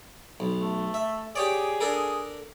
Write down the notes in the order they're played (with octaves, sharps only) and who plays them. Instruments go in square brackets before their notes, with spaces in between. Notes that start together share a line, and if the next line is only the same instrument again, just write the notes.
[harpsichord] B1
[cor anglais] A3
[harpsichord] E5
[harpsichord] G4 C#5 D5 [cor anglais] G#4
[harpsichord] D4 A4 A#4